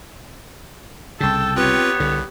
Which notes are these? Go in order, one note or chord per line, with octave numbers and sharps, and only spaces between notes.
C2 C#3 A4 G5 A5
B3 C4 F4 G4 B4 C#5
C2 D3